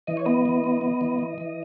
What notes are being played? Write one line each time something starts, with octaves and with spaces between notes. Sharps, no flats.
E3 D#5
C#5
B3 D#5
E3
B3
B3
E3
E3
E3